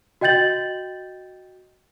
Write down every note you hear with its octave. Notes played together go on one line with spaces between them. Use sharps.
F#4 D#5 G5 G6 A6 F#7